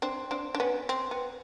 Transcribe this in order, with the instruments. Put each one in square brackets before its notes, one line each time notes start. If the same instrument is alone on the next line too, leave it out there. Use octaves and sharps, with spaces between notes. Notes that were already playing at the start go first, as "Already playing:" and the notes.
[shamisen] C4 D4
C4 D4
D4
B3 C#4
C4
B3